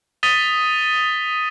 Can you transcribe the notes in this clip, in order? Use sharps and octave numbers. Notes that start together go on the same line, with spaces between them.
D#6 A6 B6 D#7 G7